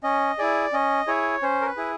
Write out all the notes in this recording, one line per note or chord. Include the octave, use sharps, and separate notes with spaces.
C#4 D#5
E4 G#4 D5
C#4 D#5
E4 G#4 C#5
C#4 C5
A#4
B4
E4 G#4